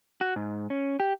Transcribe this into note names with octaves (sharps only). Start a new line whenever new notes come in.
F#4
G#2
C#4
G4